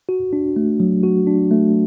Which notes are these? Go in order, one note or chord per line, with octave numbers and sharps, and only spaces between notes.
F#4
D4
A3
F#3
F#4
D4
A3